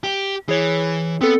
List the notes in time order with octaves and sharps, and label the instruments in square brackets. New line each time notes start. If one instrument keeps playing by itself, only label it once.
[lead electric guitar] G4
[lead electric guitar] E3 [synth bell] G#4 C#5
[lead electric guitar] B3 [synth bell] C4 A4